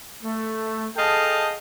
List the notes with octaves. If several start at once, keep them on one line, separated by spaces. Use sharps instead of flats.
A3
G#4 A4 D#5 F5 G5 A5